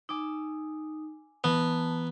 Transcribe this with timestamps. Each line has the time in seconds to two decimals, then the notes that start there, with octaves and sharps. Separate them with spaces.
0.09 D#4 G#5 D6 E6
1.44 E3 B3 A5 A#5